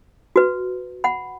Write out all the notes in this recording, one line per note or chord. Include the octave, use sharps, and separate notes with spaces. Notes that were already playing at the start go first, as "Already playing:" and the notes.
F#4 B4
F#5 B5